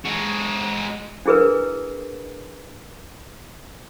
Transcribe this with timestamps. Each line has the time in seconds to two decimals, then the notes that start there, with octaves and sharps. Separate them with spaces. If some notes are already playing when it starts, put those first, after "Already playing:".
0.05 G#3 F#4
1.26 D4 E4 G#4 A#4 B4